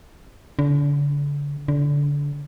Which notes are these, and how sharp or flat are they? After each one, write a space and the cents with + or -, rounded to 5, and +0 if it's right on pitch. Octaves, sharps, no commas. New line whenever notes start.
D3 -35
D3 -25